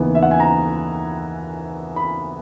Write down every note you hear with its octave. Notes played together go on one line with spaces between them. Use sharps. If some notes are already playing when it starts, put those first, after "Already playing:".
Already playing: D#2 C#3 E3 B3 D#4
E5
F#5
G#5
A#5
B5